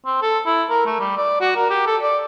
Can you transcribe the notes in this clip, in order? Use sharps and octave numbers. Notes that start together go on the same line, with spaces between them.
C4
A4
E4
A#4
A3
G3
D5
F#4
A#4
G4
A4
D5